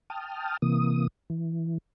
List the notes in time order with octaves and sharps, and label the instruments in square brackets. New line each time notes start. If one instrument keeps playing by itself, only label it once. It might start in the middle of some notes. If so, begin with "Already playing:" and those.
[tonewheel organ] G5 A5 D#6 F6
C3 E3 A#3 D#6
E3